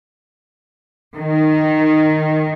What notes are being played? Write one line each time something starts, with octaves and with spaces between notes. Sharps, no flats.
D#3